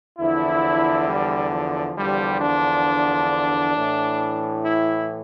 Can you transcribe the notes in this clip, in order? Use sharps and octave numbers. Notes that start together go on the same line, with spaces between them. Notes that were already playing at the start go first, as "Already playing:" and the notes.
E2 D3 F3 E4
G3
F3
E2 D3 F3 G3
D4
A2 E3
E4